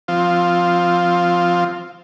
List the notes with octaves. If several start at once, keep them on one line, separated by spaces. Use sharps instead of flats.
F3 C4 F4